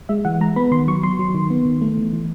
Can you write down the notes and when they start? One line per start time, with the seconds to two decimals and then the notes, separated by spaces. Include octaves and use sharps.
0.09 G#3 E5
0.25 E3 F#5
0.41 G#3 A#5
0.56 B3 B5
0.72 D#3 C6
0.88 F#3 C#6
1.03 F#3 C6
1.19 F#3
1.35 D#3
1.50 B3
1.66 D#3
1.82 A3
1.97 E3
2.13 E3